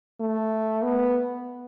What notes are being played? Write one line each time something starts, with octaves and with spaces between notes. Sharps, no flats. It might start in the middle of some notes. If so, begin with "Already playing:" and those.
A3
B3